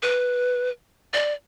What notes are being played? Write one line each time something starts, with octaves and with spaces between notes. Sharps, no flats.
B4
D5